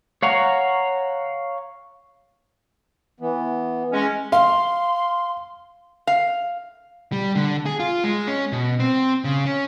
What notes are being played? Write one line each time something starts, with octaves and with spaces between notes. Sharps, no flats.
C#5 F5 F#5 A#5 C#6
E3 B3
G#3 C#4
F5 C6
F5
G3
D3
G#4
F4
G#3
C#4
B2
C4
C#3
C#4